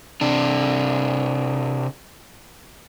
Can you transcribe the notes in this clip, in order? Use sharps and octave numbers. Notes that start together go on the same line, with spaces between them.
C3 D4